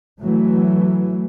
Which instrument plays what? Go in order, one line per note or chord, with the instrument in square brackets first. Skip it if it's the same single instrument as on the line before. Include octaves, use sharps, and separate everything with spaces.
[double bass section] E3 F#3 A3